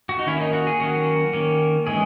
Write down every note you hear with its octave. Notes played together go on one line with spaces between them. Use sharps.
F#4
D#4
D#3 A#3 C#4 E4
D#4
F#4
G#4
D#3 F#3 A#3 C#4 F#4
D#3 A#3 C#4
E3 G#3 C#4 G#4